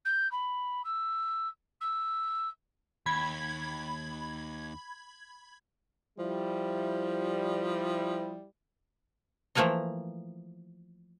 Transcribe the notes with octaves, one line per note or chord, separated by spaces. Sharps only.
G6
B5
E6
E6
D#2 B5 G#6
F3 G3 E4
E3 F3 A3 A#3 A#4 D#5